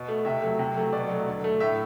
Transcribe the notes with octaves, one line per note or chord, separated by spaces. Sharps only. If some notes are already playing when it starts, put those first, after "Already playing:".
Already playing: B2
A3
C3 E5
F#3 A3
C3
F#3 A3
B2 D5
F#3 A3
D3
A3
A2 E5